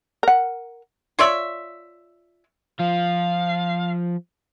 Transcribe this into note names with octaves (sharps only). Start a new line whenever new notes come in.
A#4 F#5
F4 C#5 D5 E5
F3 F5